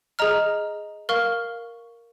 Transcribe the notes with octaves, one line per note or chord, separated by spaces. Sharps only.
G#4 D#5 A#5 F6
A#4 F5 C#6 F6